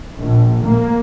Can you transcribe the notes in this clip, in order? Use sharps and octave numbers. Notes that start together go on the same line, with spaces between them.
A#1
A#3